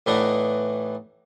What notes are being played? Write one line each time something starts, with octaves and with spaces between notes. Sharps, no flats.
A2 E3 B3 D4 D#4